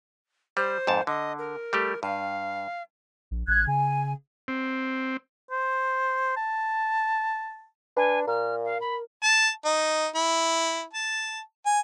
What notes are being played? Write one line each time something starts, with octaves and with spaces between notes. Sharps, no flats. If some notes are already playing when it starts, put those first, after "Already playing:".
G3 C5
F2 G#2 A5
D3 D#5
A#4
G3 A3 G4
G2 F5
A#1
A1 F#6 G#6
C#3 G#5
C4
C5
A5
D4 B4 G#5
A#2 A#4 F6
F5
B5
A5
D#4
E4
A5
G#5